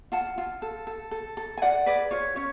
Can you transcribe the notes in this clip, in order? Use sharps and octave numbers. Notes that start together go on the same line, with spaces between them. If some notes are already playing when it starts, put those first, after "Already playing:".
F4 F#5 A5
F4
A4
A4
A4
A4
G#5
F4 D5 F#5
G#4 B4 D5
F4 C#5
C#4 C#5